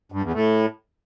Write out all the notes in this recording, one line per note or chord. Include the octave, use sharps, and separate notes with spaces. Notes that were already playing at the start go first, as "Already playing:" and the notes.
G2
E2
A2